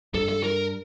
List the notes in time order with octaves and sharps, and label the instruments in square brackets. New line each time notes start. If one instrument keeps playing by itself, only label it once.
[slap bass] G2 [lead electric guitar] A4
[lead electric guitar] A4
A#4